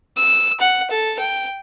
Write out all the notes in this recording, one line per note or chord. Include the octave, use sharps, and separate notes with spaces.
E6
F#5
A4
G5